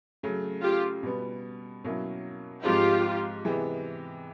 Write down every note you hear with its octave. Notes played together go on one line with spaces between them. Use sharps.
C#3 F#3 A3
F4 G4
B2 G3 B3
B2 F#3 A#3 C#4 E4
G#2 F3 G#3 C4 F4 G4
C3 E3 G#3 B3